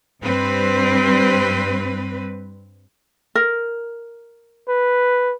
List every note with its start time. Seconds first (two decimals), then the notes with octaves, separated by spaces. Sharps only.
0.23 G2 G3 C4 B4
3.35 A#4
4.69 B4